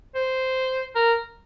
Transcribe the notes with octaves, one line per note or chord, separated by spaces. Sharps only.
C5
A#4